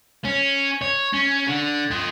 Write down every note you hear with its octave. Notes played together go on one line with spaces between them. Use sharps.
C#4
C#5
C#4
D3
F3 D#5